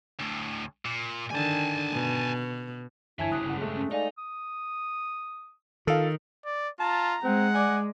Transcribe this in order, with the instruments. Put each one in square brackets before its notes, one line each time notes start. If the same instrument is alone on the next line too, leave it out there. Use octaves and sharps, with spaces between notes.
[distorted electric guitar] D2 A2
A#2
[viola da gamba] D3 D#3 [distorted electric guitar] G#5 A5
[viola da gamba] B2
[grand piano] G1 G#6 [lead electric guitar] E3 [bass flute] E4 [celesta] E5 G#5 A5
[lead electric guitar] G2 C#3 [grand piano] D#6 [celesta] F#6
[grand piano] F#1 F#5
G#3 A3
[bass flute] C#4
[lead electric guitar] D#4 [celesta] A4 F5 G#5 [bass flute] D5
[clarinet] D#6
[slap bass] D#3 [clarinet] F4 [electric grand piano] A4 F5
[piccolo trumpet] D5
[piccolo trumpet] F4 [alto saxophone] A5 [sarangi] A#5
[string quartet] G#3 [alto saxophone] C4 [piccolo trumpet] F#5
[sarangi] D5 [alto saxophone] G#5